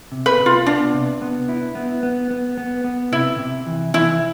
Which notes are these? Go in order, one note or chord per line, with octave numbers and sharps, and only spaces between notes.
C3
B4
C3
F4
B3 D4
C3
B3
E4
B3
B3
B3
B3
B3
C3 E4
C3
E3
E3 E4